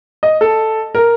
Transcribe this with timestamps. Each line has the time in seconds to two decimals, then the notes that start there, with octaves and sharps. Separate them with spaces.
0.23 D#5
0.41 A4
0.95 A#4